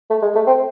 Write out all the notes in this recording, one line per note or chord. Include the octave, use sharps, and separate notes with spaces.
A3
G#3
A3
C4